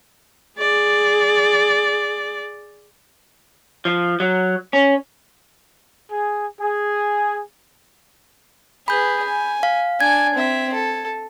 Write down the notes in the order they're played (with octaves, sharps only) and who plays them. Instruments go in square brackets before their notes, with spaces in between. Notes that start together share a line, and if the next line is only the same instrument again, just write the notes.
[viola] G#4 D5
[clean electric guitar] F3
F#3
C#4
[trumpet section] G#4
G#4
[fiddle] G#4 B4 [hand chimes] B5 G6
[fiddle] G#5
[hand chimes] F5
[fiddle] D4 G#5 [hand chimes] G#6
[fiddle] C4 E5
A4